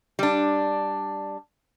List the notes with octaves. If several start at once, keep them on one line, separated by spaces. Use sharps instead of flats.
G3 D4